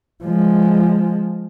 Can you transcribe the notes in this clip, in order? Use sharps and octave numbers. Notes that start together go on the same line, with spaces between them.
F3 G#3